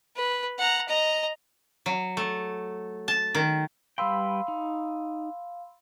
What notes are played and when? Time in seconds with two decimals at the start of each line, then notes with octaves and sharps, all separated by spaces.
0.16 B4
0.59 F#5 A#5
0.88 D#5 A#5
1.86 F#3
2.17 A3
3.08 A5
3.35 D#3
3.98 G3 B4 F5 G5 B5 C6 E6
4.48 D#4